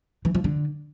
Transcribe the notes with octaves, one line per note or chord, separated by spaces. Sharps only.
E3
F3
D3